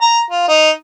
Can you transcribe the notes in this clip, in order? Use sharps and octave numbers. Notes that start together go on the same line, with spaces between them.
A#5
F4
D#4